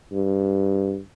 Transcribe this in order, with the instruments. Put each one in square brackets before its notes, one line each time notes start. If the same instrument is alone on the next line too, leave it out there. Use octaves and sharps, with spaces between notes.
[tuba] G2